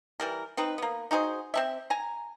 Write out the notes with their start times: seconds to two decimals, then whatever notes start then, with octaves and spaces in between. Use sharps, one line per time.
0.20 E3 G3 A#4
0.57 C4 D#4 B4
0.78 A#3 B3
1.11 D#4 F#4 G#4 C5
1.54 C4 C#4 E5
1.90 G#5 A#5